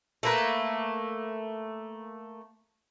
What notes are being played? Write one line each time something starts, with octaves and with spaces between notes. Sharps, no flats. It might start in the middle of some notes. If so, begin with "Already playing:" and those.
A3 A#3 B4